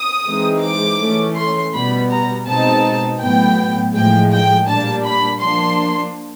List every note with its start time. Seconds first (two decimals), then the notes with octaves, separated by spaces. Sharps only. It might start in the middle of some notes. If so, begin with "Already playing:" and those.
Already playing: D#6
0.26 E3 G#3 C4 D#4
0.63 D6
1.00 E3 A3 C#4
1.36 C6
1.74 B2 G3 B3 B5
2.10 A#5
2.48 B2 G#3 C4 D#4 A5
3.20 A2 F#3 B3 G5
3.95 A2 F3 G#3 G5
4.32 G5
4.68 A#2 G3 A#3 D4 A5
5.05 B5
5.41 F3 A#3 D4 C6